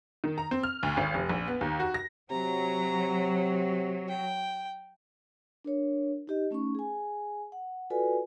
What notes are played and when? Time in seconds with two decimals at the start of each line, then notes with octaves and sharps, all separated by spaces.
0.24 D#3
0.38 A#5
0.51 C4
0.63 F6
0.83 D2
0.97 G#1
1.14 F1
1.29 A#1
1.48 B3
1.61 D#2
1.80 F#4
1.94 A#6
2.30 C3 F#3 A#5
4.08 G5
5.64 D4 A#4 C#5
6.27 D#4 G4 D#5
6.51 A3 C#4 D#4 C#6
6.75 G#4 G#5
7.52 F#5
7.90 F4 F#4 A4 B4 D5 G#5